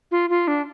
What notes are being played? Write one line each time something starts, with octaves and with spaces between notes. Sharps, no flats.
F4
F4
D4